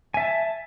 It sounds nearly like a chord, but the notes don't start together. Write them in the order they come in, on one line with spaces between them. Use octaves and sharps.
G#5 E5 A5